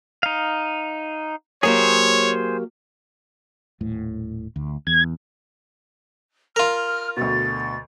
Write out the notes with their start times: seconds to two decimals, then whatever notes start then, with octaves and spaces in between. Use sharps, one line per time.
0.23 D#4 F5
1.63 F#3 A#3 G4 G#4 C5 C#5
3.81 D#1 A2
4.56 D2
4.87 E2 G#6
6.56 F4 A#4 F6
7.17 D2 B2 A6